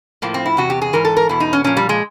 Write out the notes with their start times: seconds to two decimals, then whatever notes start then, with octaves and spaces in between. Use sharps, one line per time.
0.22 A2 F3 A#3
0.34 C4
0.46 E4
0.57 E2 C3 F#4
0.70 G4
0.82 G#4
0.93 G#2 E3 A#4
1.05 A4
1.17 A#4
1.29 E2 B2 E4
1.40 D#4
1.53 C#4
1.64 A#2 F3 C#4
1.77 G3
1.89 G#3